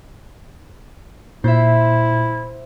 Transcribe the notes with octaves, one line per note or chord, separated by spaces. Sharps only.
A#2 E4 C5 E5